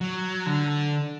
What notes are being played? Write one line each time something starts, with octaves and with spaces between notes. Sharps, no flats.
F#3
D3